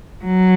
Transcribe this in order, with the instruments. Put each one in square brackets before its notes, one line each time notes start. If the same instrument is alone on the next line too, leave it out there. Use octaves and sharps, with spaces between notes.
[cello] F#3